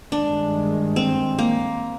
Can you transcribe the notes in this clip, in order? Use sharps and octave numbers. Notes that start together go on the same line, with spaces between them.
G2 D#3 G#3 D4
C4
A#3